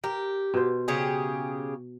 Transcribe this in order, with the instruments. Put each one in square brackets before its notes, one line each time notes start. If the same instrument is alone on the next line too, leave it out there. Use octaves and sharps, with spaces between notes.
[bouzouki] G4 [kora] A#4
[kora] B2 C5
[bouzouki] C#3 G4 G#4